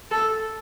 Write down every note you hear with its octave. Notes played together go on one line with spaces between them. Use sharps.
A4